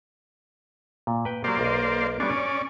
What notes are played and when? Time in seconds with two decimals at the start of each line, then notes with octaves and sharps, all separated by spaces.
1.07 A#2
1.25 B4 G5
1.44 F#3 A#3 G4 C5 D5
1.60 B1 D#5
2.20 G3 B3 C#4 D4 D5
2.36 C#5